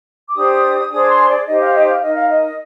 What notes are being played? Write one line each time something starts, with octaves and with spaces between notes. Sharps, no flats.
D6
D4 G4 C5 D#6
D4 G#4 C5 D#6
D6
C6
D5
D#4 G4 C5 D#5
F5
D#5
F5
D#4 A#4 D#5
F5
D#5